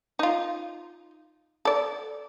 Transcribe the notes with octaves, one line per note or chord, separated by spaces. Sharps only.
D#4 F4
A4 D5